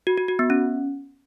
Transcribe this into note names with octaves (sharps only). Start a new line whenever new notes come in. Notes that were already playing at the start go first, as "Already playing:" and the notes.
F#4
F#4
F#4
B3
C#4